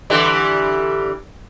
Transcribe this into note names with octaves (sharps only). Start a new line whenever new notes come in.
D3 E3 G3